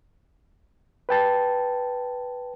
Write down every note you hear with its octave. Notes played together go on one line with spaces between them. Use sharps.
B4 G5 A5